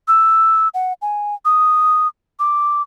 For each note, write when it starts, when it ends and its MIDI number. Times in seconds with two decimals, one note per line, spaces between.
0.08 0.68 88
0.74 0.93 78
1.02 1.35 80
1.45 2.08 87
2.39 2.82 86